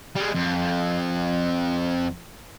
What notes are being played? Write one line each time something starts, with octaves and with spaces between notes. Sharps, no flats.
G3 G#3
F2